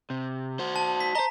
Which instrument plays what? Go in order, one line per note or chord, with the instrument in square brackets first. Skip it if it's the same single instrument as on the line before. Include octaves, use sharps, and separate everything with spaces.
[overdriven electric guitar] C3
F#4 C5
[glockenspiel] A5
B6
[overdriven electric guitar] C5 D#5 [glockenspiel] A#5